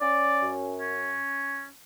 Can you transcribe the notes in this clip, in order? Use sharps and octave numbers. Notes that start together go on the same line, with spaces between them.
C#4 D5
F#2
C#4